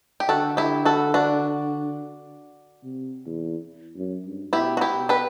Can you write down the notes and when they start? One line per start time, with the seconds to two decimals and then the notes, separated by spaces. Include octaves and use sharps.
0.20 G4
0.29 D3 F#4 A4
0.57 E4 G4
0.85 F#4 A4
1.14 D4 F#4
2.83 C3
3.26 E2
3.96 F#2
4.25 G2
4.53 B2 E4 G4
4.77 F#4
4.81 E4 G4
4.95 B2
5.09 G4 B4